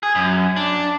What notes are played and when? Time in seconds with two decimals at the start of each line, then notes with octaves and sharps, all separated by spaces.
0.03 G#4
0.15 F#2
0.56 D4